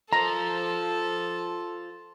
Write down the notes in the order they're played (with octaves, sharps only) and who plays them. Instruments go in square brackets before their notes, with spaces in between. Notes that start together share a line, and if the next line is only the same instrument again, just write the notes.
[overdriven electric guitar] F4 C5 [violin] A4 [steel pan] A#5